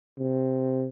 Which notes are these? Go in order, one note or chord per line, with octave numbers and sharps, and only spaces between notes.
C3